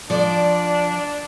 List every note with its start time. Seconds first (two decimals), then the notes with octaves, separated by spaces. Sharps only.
0.10 F3 D4 D5